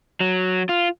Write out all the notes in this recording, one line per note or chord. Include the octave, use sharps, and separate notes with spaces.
F#3
F4